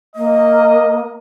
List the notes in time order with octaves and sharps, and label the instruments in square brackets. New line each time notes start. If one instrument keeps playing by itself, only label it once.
[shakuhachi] A#3 [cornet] D#5